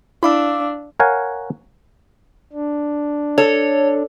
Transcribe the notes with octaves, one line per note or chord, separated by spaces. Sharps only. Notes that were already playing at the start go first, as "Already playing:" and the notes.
D4 E4 F5 D6 E6
A#4 C#5 F5 F#5 G#5
D4
A4 C#5